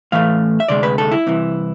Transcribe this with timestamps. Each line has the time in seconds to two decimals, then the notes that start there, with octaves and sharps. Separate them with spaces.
0.12 A2 E3 A3 F5
0.60 E5
0.68 D2 C3 G#3 D5
0.83 B4
0.98 A4
1.11 E4
1.27 C2 C3 E3